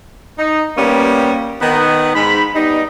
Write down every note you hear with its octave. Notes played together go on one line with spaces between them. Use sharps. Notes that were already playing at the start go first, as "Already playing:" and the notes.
D#4
G3 A#3 B3 C#4 G4
D#3 B3
G#2 B5
G3 B3 D#4